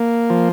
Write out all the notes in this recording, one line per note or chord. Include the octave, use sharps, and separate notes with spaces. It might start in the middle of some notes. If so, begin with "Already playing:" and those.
Already playing: A#3
F3